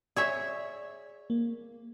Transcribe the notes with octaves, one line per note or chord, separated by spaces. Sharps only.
G#4 C#5 D5 E5
A#3